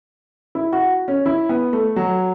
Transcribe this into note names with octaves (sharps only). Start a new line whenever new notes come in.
E4
F#4
C#4
E4
B3
A3
F#3